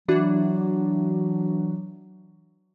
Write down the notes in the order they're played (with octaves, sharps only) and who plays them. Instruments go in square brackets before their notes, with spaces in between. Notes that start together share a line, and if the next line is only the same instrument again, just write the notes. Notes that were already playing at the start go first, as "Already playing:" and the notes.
[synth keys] E3 D4 F#4 [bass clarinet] F#3